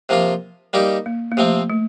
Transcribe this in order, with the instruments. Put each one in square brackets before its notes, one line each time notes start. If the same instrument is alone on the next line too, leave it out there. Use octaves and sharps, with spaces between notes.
[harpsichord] C3 F3 A#3 F4
G3 A#3 D#4 G4
[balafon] A#3
A#3
[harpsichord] C3 F3 C4 [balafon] A3
[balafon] A3